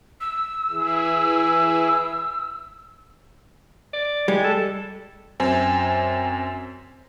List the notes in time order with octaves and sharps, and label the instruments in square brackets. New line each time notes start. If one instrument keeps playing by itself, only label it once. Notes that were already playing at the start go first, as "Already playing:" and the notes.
[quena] E6
[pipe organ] E3 E4 G#4
[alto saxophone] D5
[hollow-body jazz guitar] G3 [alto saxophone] G#3
[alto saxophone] A4
[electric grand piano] F#2 C4 G#5